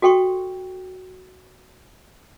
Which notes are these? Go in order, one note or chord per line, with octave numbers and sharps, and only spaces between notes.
F#4 A4 G5 C6 C#6